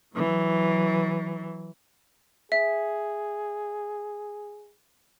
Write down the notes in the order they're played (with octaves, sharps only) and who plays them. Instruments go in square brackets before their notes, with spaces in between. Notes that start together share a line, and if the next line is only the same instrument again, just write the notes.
[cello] E3 F#3
[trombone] G#4 [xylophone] E5